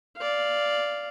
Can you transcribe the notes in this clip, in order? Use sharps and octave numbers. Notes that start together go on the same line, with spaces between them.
D5 F5